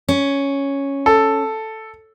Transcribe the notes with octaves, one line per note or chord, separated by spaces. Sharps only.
C#4
A4